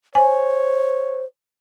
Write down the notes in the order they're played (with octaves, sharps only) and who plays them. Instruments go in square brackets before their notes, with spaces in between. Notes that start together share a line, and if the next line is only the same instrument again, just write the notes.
[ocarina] C5 [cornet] C#5 [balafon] G#5